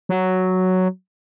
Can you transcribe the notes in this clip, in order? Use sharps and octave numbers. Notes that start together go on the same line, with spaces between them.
F#3